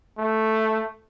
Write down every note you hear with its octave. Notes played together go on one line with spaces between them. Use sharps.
A3